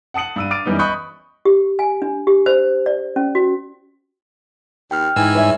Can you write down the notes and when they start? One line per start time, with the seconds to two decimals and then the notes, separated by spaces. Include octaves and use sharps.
0.14 F#5 A5 D#6 C#7 F#7
0.36 G2 E6 D#7
0.51 D6 F6 A6 D7 D#7
0.65 F#2 E3 G3 B3 D#4
0.79 D#5 B5 C#6 D#6 F#6 G6
1.45 G4
1.79 G#5
2.02 D4
2.27 G4
2.46 C5
2.86 D5
3.16 C#4
3.35 F#4
4.91 D#2 G5 F6
5.16 G#2 E3 G#5 E6
5.35 G2 B4 C#5 E5